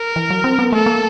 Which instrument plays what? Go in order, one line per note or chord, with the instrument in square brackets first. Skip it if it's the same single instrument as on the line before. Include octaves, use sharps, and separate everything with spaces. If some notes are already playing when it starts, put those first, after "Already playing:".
Already playing: [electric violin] A#4
[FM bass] E3
F#3
C4
B3
[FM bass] A3 [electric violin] A4
[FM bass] A#3